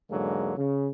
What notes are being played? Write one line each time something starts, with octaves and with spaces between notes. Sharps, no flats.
E2 G#2 D3 F#3 G#3 A#3
C#3